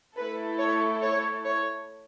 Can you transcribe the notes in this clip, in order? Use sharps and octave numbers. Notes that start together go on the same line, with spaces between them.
A3 E4 A4 B4
C#5
C#5
C#5